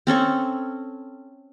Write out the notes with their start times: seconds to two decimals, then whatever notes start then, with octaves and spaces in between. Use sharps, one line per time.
0.07 C4 C#4 A4 C#6